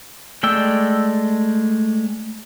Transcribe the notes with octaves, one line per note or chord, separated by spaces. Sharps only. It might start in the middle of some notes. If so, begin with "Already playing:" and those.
G#3 A3 D5 G5 E6